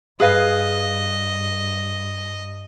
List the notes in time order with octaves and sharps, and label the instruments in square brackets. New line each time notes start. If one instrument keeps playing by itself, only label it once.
[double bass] G2 [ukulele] G#4 B4 F5 [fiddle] D#5